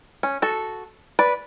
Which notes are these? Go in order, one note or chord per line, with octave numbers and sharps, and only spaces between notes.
C#4
F#4 A4
B4 D5